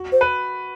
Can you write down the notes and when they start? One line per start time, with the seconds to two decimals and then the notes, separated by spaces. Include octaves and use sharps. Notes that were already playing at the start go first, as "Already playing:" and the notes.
Already playing: F#4
0.12 C5
0.21 B4